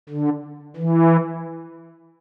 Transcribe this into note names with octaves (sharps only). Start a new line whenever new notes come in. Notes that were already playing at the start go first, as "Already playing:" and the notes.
D3
E3